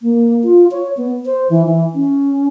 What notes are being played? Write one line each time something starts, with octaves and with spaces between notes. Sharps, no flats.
A#3
F4
C#5
B3
C5
E3
E3
C#4